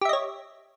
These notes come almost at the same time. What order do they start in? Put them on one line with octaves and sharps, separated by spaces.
G4 E5 D#5 C#5